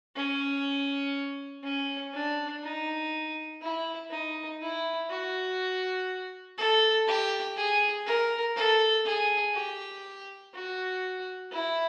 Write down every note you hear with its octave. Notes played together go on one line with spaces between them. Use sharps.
C#4
C#4
D4
D#4
E4
D#4
E4
F#4
A4
G4
G#4
A#4
A4
G#4
G4
F#4
E4